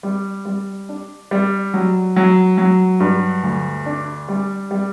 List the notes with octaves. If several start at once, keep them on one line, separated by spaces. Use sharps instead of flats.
G3
G3
D4
G3
F#3
F#3
F#3
G2
D2
D4
G3
G3